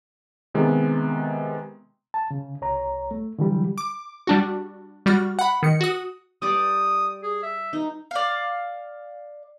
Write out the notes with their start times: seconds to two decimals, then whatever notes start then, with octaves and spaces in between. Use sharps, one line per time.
0.54 C3 D#3 G#3 B3
2.14 A5
2.31 C#3
2.61 C2 C#5 A#5
3.11 A3
3.39 D3 E3 F#3 G3
3.78 D6
4.27 G3 D4 F#4
5.06 G3 F#4 F6
5.39 F#5 B5
5.63 D#3 C#7
5.81 F#4 D#6
6.42 G3 G4 D5 D#6
7.23 G#4
7.43 E5
7.73 D#4
8.11 D5 F5